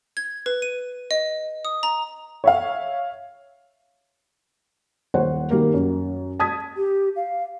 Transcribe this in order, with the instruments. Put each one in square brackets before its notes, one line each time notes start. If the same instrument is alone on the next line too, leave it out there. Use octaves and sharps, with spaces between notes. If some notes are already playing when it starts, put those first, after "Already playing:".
[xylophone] G#6
B4
D#7
D#5
D#6
A#5
[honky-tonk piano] C#5 E5 F5
[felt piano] D#1 C5 C#5 F#5
D#3 G3 A#3 A#4
F#2
A5 D#6 G#6 B6
[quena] G4
F5